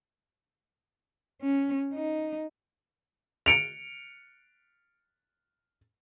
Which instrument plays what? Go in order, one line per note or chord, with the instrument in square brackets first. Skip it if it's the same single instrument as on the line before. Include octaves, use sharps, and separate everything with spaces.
[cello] C#4
D#4
[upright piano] C#7 D7 F7